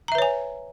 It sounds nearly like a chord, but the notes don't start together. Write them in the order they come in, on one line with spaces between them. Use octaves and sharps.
A#5 E5 B4 C#5 G#5